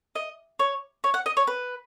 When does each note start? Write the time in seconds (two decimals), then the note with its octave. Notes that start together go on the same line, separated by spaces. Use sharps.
0.15 D#5
0.59 C#5
1.04 C#5
1.14 F#5
1.26 D#5
1.37 C#5
1.47 B4